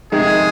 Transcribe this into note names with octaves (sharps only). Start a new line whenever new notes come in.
F2 C3 D#3 G#3 D#4 G#4